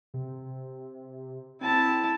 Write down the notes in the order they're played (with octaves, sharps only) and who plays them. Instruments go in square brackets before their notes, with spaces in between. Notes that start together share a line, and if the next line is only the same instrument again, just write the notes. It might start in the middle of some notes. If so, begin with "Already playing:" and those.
[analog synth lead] C3
[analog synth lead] C4 [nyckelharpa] E4 A5